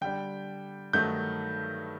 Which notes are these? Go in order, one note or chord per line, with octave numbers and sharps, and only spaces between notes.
D3 G3 D4 G5
G2 D#3 F#3 A3 D#4 G6